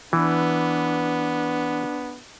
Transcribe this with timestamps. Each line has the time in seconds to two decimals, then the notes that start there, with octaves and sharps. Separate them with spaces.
0.13 E3 B3 D4